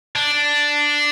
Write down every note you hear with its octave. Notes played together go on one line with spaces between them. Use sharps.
D4